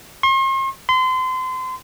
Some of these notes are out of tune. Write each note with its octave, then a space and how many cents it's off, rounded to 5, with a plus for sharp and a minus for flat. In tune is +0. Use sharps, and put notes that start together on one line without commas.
C6 +45
C6 -30